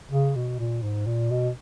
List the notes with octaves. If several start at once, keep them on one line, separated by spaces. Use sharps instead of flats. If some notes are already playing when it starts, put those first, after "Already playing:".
C#3
B2
A#2
G#2
A#2
B2